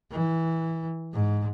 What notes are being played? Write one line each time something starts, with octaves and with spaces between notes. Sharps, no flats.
E3
G#2